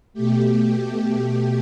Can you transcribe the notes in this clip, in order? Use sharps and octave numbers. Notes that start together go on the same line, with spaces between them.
B2 A3 G4